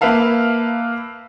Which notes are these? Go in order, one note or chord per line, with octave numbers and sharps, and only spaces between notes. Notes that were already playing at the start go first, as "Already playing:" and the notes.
A#3 B4 E5 F5 A5